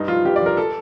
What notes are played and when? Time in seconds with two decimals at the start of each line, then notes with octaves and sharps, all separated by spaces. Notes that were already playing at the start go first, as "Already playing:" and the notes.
Already playing: G2 D#4
0.08 F3 F4
0.25 G2 G4
0.36 D5
0.41 F3 A#4
0.57 A4